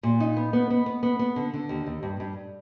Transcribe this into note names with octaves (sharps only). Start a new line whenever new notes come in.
A#2
D#4
B3
B3
B3
B3
B3
B3
D3
D3
D#2
D#2
G2
G2